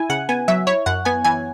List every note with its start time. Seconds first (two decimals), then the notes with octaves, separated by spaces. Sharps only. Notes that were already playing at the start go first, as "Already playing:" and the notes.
Already playing: E4 G#5
0.10 C#3 F#5
0.29 B3 G#5
0.48 F#3 E5
0.67 E4 C#5
0.86 F#2 F#5
1.05 B3 G#5
1.24 E3 G#5